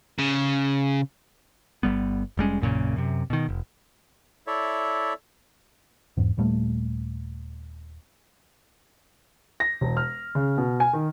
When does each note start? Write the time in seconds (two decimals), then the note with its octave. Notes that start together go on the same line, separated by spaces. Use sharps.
0.19 C#3
1.83 G1 G3 B3
2.37 F1 G3 G#3 C#4
2.60 A#1 F#2 A#2 C#3
2.96 F#2 C3
3.30 B2 D#3
3.49 F1
4.47 E4 A4 C#5 D5 E5
6.17 E2 G#2
6.37 D#1 A#2 G3 A3
9.60 A#6
9.81 E1
9.97 F6
10.35 C#3
10.58 B2
10.80 G#5
10.93 D#3